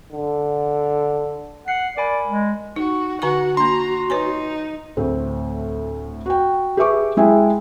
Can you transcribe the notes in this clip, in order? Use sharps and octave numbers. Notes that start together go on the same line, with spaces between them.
D3
F#5 C7
A#4 D5 G#5 B5
G#3
D#4 F#4
D3 F#4 F#5 G#5 C#6
A#3 D4 A#5 C6
D#4 B4 C#5 G#5
D2 A2 C4
F#4 G5
G4 G#4 B4 E5 C#6 D6
G#3 E4 G#4 E5 G5 G#5